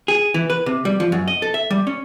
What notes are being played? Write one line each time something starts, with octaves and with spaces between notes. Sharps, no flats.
G#4
E3
B4
C3
G3
F3
F#2
D#5
A4
E5
G3
C#4